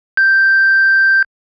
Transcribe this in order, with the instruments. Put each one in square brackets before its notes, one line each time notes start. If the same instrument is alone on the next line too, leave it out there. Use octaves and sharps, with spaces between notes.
[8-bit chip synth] G6